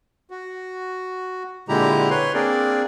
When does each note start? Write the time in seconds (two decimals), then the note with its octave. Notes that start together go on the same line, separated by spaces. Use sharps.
0.30 F#4
1.69 A#2 D3 G#3 E4 G4 A#5
2.10 B4 C#5 C6
2.34 A#3 C4 D4 G#4 A#4 D5